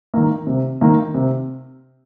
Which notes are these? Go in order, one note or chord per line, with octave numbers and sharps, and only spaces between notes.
D#3 A#3
C3
D#3 A#3
C3